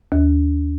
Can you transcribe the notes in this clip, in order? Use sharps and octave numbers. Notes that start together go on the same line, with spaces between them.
D#2